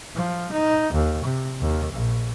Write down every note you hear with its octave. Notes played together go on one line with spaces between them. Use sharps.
F3
D#4
D#2
C3
D#2
A#1